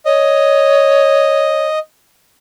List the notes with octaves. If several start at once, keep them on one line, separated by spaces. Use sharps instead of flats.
C#5 D#5